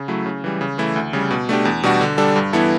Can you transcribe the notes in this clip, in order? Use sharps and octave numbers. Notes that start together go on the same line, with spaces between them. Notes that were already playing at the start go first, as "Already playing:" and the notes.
Already playing: C#3
F#3 A3 E4
C#3
E3 G3
C#3
E3 A3 E4
D2
C#3 G3
B2
A3 D4 G4
E2
B2 G3 D4 F#4
D3
G3 D4 A4
G2
E3 B3 E4 A4